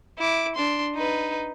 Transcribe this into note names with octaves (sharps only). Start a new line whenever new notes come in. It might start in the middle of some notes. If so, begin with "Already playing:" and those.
E4 D6
D4 C6
D#4 B4